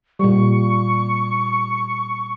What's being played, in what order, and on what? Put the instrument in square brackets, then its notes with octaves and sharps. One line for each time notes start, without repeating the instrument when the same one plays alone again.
[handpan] A#2 G3 [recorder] C#6